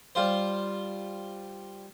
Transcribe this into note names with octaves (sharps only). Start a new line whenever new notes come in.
G3 F4 C5